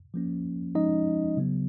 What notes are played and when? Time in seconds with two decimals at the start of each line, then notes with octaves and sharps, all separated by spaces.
0.14 F3 A#3 C#4
0.75 F3 G#3 C#4 D#4 D#5
1.37 C#3 F#3 B3